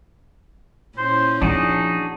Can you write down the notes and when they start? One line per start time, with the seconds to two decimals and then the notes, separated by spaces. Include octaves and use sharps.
0.98 A#2 C#4 E4 C5
1.42 F3 D4 D#4 F#4 G#4